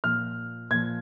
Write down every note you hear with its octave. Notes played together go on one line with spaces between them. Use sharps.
A#2 F3 F6
A#2 F3 G#6